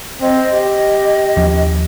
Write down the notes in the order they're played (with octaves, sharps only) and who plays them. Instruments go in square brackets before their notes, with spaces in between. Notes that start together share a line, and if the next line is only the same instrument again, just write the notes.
[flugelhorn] C4 [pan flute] D#5
[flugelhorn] G4 [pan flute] D#5
[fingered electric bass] D#2 F3 C#4